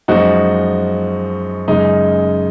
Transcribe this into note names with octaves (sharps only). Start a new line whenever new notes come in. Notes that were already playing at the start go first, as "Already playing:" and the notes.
F#2 F3 G#3 D#4 F#4
F#2 C#3 G#3 D#4